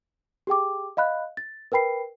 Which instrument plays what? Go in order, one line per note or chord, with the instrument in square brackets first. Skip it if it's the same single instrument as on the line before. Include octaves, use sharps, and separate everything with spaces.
[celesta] G4 G#4 G5 D6
D#5 F5 B5 F#6
A6
A#4 B4 G5 B5 C7